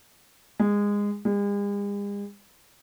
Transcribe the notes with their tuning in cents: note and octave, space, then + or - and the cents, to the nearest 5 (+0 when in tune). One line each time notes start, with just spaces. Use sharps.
G#3 -20
G#3 -45